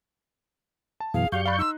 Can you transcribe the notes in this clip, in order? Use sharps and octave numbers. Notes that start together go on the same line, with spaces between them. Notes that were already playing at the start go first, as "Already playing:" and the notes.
A5
F#2 B2 E3 G#4 F5
F#2 F#4 G4 D5 F5 C#6 G6
D5 F5 B5 F#6
D#4 C6 E6